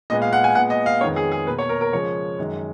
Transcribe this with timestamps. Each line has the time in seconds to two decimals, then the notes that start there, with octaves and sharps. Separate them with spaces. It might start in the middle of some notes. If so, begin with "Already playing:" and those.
0.10 A#2 G#3 B3 D#5
0.22 F5
0.33 F#5
0.44 G#5
0.55 A#2 G#3 B3 F#5
0.70 D#5
0.86 F5
1.01 F2 D#3 G#3 B3 C#5
1.16 G#4
1.32 G#4
1.47 B2 A#3 B4
1.58 C#5
1.69 A#4
1.81 A#4
1.93 C#3 F3 G#3 C#5
2.39 F#2 D#3 G#3